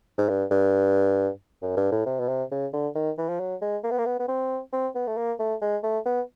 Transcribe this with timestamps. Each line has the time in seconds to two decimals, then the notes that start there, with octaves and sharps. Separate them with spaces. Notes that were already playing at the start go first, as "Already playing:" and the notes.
0.18 G#2
0.29 G2
0.51 G2
1.62 F#2
1.77 G2
1.92 A2
2.06 C3
2.19 B2
2.28 C3
2.51 C#3
2.73 D3
2.95 D#3
3.18 E3
3.29 F3
3.40 F#3
3.62 G#3
3.84 A#3
3.91 B3
3.98 A#3
4.06 B3
4.19 B3
4.28 C4
4.73 C4
4.95 B3
5.07 A3
5.17 A#3
5.39 A3
5.61 G#3
5.83 A3
6.06 B3